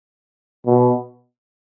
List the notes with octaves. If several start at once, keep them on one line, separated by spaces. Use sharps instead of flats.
B2